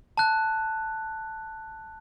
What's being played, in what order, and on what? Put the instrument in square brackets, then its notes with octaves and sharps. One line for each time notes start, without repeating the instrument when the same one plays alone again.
[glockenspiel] A5 F#6